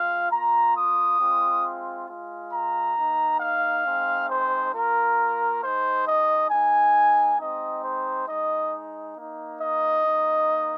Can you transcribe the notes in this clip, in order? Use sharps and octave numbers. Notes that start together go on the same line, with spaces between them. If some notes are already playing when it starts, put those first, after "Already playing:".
Already playing: G#3 F4 F5
A#3 F4 A#5
D#6
G#3 C4 F4
G#3 F4
A#5
A#3 D#4
F5
G#3 C4 D#4
C5
A#3 F4 A#4
G#3 D#4 C5
D#5
A#3 D#4 G#5
G#3 C4 D#4 D#5
C5
G#3 D#4 D#5
A#3 D#4
D#5
A#3 D#4